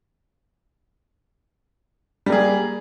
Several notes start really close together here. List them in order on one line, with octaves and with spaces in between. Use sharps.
G3 A#3 G#4